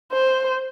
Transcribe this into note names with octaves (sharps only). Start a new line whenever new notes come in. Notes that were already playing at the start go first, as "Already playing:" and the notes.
C5